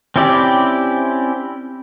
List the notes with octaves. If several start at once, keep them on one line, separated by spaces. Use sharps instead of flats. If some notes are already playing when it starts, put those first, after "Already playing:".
C4 C#4 E4 G4 D5